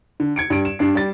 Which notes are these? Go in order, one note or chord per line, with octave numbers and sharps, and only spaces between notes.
D3
G#6 C#7 D7
G2 D7
E7
G2 D4 C7
G3 A6